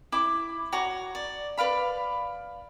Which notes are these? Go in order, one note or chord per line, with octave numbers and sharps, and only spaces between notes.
E4 D6
F#4 C#5 A#5 D6
D5
B4 D5 F5 B5